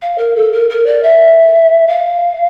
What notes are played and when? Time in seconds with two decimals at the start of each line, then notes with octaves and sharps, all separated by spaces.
0.01 F5
0.17 A#4
0.35 A4
0.52 A#4
0.69 A#4
0.85 D5
1.02 E5
1.87 F5